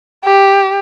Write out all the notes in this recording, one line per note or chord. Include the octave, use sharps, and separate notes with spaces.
G4